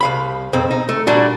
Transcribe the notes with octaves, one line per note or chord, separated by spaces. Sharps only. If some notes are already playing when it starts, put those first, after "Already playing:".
C2 F5 B5
B1 F2 C4
D#4
A3
A#2 G3 D4 F#4